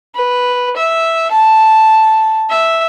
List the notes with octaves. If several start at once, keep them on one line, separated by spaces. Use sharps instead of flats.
B4
E5
A5
E5